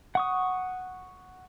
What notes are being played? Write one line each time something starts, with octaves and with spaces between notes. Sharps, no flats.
F#5 C#6 D#6